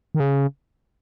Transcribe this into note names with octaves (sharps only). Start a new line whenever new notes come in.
D#3
C#3